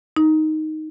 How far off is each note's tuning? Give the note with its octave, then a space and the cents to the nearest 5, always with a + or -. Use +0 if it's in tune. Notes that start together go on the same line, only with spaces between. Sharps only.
D#4 +0